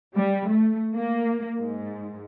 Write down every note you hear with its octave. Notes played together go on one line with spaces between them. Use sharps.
G3
A3
A#3
G#2